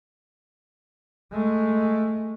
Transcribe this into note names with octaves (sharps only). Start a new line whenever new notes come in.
G#3 A3